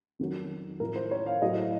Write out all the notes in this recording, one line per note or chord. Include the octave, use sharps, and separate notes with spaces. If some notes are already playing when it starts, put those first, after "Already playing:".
F2 D#3 F#3
A2 F3 A#4
C5
C#5
F5
A2 F#3 D#5